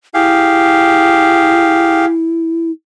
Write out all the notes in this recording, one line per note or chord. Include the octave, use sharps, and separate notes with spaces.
E4 G4 G#4 F5